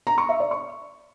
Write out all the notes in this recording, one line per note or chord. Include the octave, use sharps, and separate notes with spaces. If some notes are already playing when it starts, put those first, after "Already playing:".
A#5
C#6
E5
D5
C#6